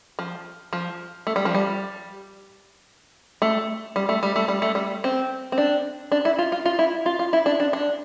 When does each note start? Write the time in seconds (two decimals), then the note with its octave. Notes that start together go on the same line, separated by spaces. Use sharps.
0.19 F3
0.73 F3
1.27 A3
1.36 G3
1.45 F3
1.55 G3
3.42 A3
3.96 G3
4.09 A3
4.23 G3
4.36 A3
4.48 G3
4.62 A3
4.75 G3
5.04 C4
5.52 C4
5.58 D4
6.12 D4
6.25 E4
6.39 F4
6.52 F4
6.66 F4
6.79 E4
7.06 F4
7.19 F4
7.33 E4
7.46 D4
7.60 D4
7.73 D4